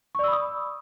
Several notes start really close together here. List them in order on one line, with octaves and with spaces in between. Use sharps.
C#6 D5 E6 B5 D#6